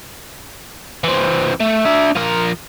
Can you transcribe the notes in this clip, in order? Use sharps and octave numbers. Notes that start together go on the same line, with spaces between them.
E3 C4
A3
D4 E5
F3 A#4